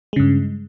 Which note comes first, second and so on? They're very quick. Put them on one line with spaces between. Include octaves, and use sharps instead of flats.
G#3 C#3 G2